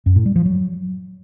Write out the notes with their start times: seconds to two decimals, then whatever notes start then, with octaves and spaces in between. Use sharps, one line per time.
0.06 F#2
0.16 A2
0.26 G3
0.36 F3
0.46 F#3